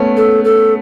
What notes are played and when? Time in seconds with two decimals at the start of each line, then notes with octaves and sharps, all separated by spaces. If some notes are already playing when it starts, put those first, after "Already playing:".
Already playing: A3 B3 C#4
0.17 A4
0.44 A4